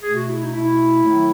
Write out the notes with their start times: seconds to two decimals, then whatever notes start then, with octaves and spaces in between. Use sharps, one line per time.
0.03 B2 A3 G#4
0.16 F#4
0.28 E4
0.41 D#4
0.53 B2 A3 E4
1.02 D#3 F#3 A3